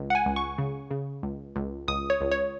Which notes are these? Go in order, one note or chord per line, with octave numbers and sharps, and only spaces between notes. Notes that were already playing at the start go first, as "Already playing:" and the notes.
Already playing: C#2
F#5
G#5
C#2
C#6
C#3
C#3
C#2
C#2
C#2 D#6
C#5
C#2
C#5